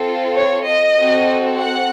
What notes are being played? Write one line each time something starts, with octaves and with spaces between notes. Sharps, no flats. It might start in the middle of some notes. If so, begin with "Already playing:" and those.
Already playing: C4 F4 A4
C#5
D#5
C4 F#4 A4
F#5